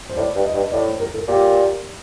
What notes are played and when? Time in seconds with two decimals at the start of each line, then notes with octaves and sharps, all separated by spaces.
0.10 C5
0.17 A2 D5
0.35 G2
0.45 D#5
0.54 G2
0.72 A2 D5
0.86 C5
1.00 A#4
1.14 A4
1.28 A#2 G4